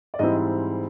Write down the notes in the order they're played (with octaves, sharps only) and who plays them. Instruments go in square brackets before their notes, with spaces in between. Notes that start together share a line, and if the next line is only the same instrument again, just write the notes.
[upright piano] D5
G#2 E3 G3 C4 E4 D#5